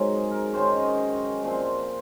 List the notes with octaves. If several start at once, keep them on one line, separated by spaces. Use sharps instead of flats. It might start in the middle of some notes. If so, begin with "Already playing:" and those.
Already playing: G#2 F#3 C4 A#4 G#5
G#4
A#4
F#2 D#3 G#3 C#4 C5
D#5
A#2 F3 C4